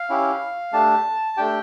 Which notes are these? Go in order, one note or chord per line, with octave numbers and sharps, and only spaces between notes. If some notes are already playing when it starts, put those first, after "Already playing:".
Already playing: F5
C#4 E4 G4
A3 D4 G4 A5
A3 D4 G4 G5